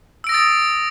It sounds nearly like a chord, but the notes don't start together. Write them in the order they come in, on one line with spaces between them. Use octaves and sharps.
E6 D7 A#6 D#6 A6